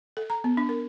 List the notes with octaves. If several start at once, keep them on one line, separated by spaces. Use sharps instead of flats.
A4
A#5
B3
D4
A#4